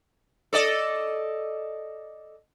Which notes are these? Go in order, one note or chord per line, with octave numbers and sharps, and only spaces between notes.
A4 D5 D#5